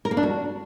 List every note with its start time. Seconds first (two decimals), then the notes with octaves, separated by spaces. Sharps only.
0.05 A#4
0.11 A#3
0.17 D4
0.23 F#4